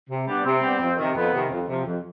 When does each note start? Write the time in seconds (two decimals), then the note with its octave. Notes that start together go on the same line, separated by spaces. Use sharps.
0.09 C3
0.27 G3 B3 D4
0.45 C3 C4
0.61 G3 B3 D4
0.80 F2
0.97 C3 D#3
1.15 F2 B3
1.33 C3 D#3
1.50 F2
1.68 C3 F3
1.85 F2